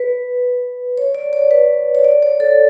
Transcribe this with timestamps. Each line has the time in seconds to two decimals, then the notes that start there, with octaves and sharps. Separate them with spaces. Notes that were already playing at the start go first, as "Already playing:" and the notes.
Already playing: B4
0.98 C#5
1.15 D5
1.33 C#5
1.51 B4
1.95 C#5
2.04 D5
2.23 C#5
2.40 A4